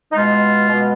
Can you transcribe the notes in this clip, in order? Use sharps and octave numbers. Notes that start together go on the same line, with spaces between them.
D#4
B2 G#3 F4
B2 G#3